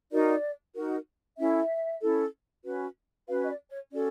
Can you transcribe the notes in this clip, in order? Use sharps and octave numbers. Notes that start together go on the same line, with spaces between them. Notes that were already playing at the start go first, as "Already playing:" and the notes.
D#4 F#4 A#4 D5
D#4 F#4 A#4
C#4 E4 A4 E5
C#4 E4 A4
C#4 F#4 B4
C#4 F#4 B4 F5
D#5
D5
C#5
C#4 F#4 A4 D5